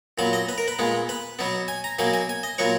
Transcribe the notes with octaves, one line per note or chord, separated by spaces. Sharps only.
A#2 F#3 B3 B5
D#5
B4
A#4
B4
A#2 G#3 B3
B4
B2 F#3 B3
G#5
A#5
B2 F#3 A#3 G#5
G#5
G#5
D#5
A#2 F#3 B3 C#5